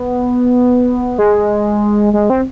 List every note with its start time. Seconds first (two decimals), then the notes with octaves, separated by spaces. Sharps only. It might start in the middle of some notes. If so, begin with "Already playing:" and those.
Already playing: B3
1.19 G#3
2.13 G#3
2.30 C4